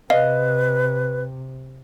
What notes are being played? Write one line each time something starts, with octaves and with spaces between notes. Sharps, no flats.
C3 B4 D#5 F5